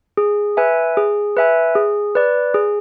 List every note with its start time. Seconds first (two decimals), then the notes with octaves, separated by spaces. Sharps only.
0.17 G#4
0.57 B4 E5 G#5
0.97 G#4
1.37 B4 E5 G#5
1.75 G#4
2.15 B4 D5
2.54 G#4